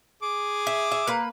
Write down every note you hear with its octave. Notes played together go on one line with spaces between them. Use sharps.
G#4 D6
E5
E5
A#3 B4